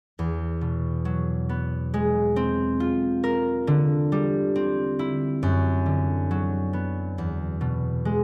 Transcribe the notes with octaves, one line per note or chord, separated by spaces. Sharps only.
E2
B2
F#3
B3
G#3
C4
F4
A#4
D3
G3
C4
E4
F#2
D3
F#3
B3
E2
B2
G#3